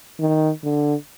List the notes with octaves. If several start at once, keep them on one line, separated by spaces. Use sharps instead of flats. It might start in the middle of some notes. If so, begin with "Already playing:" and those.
D#3
D3